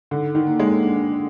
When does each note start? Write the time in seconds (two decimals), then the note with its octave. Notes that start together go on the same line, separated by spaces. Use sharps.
0.11 D3 D#4
0.35 D#3
0.47 A#3
0.60 G#3
0.83 D4